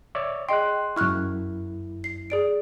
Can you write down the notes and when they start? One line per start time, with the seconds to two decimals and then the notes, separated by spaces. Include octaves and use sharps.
0.15 C#5 D5 E5
0.49 G#4 D#5 G5 C6 F#6
0.96 F#2 E4 C#6 F6 F#6
2.04 C7
2.30 G#4 D5 D7